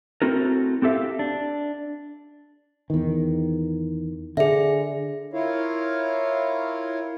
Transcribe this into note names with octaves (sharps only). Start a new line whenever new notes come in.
A3 C4 E4 F#4 A4 A#4
C4 G4 A4 E5 F5
D4
E2 D#3
D3 G#4 E5
E4 F4 A#4 C#5 F5